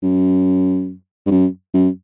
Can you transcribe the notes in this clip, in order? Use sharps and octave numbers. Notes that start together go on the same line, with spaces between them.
F#2
G2
F#2
F#2